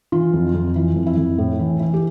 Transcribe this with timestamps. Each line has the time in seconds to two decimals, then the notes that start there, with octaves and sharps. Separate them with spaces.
0.12 E3 F4
0.33 F2
0.54 F2
0.76 E3 E4
0.96 F2
1.06 E4
1.17 F2
1.38 A2
1.59 E3
1.80 E3
1.94 G4